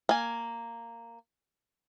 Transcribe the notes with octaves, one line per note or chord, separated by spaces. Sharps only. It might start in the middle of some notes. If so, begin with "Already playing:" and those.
A#3 G#5